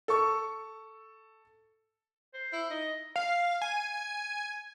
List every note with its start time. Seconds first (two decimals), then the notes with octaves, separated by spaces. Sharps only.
0.08 A4 C#6
2.34 C5
2.53 E4
2.70 D#4 D#5
3.16 F5
3.62 G#5